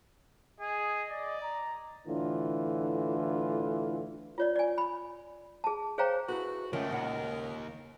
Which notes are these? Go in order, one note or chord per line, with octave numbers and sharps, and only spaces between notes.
G#4 D#5
D5
A#5
A2 D3 E3 F4
F4 C#5 D5
D5 G#5
B5
G#4 A5
G#4 C5 C#5 F5 G5 A#5
E4 F#4 G#4 B4
C#2 D#3 A3 C#4 F4 A#4
D#2 A#2 F#5